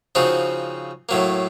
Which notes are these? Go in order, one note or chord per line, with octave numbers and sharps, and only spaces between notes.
C#3 F3 C4 D#4 F#4
A2 F#3 A#3